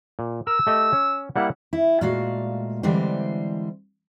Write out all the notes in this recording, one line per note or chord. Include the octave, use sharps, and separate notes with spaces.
A#2
A#4 E6
A3 G4 D#5
C#4
G3 A#3 E4 F#5
E4
A#2 G#3 A3 F#4 F5
D3 E3 G3 G#3 C4 C5